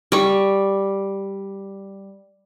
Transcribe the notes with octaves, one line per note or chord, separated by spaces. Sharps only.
G3 C#6